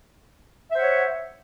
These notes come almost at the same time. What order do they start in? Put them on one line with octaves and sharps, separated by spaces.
E5 C5 F#5 C#5